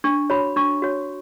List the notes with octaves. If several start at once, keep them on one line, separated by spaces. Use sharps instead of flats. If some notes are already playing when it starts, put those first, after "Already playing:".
D4 C#6
F#4 C#5 B5
D4 C#6
F#4 C#5